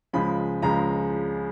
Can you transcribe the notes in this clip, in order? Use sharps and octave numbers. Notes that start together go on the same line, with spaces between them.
C#2 C#3 F3 G#3 B5
C#2 C#3 F3 G#3 A#5